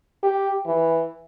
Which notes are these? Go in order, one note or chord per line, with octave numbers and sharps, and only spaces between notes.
G4
E3